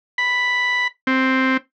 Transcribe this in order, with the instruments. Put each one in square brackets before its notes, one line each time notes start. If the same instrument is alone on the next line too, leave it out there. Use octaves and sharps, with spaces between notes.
[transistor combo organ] B5
C4